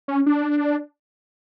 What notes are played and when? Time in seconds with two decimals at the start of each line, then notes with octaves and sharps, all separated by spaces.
0.08 C#4
0.26 D4